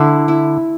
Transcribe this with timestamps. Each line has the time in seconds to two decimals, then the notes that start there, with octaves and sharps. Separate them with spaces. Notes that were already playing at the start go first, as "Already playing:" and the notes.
Already playing: D3 A3 E4
0.28 E4